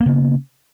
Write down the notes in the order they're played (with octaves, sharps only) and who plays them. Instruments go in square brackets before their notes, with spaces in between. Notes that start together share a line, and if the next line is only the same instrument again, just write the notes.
[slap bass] A#3
B3
C#3